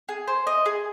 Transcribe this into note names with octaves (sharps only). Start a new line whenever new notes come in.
G#4
C5
D#5
G#4